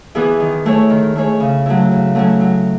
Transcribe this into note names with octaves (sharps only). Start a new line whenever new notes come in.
E3 B3 E4 G#4
D#3
A3 E4 G#4 C#5
D#3
A3 E4 G#4 C#5
C#3
F#3 A3 C#4 E4
C#3
F#3 A3 C#4 E4
F#3